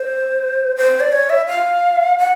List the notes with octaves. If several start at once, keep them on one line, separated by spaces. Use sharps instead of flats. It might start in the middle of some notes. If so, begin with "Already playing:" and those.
Already playing: C5
C5
D5
C#5
E5
F5
F#5